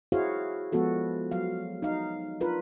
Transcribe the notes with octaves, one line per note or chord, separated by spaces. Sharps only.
E4 F#4 G#4 C5 C#5 F5
F3 G#3 B3 F#4 A4
F#3 F5
D#4 F5
D4 F4 A#4 B4